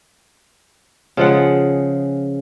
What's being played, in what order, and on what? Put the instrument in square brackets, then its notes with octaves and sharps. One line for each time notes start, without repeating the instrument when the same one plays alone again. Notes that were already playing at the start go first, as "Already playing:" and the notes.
[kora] C#3 F3 G#3 F#5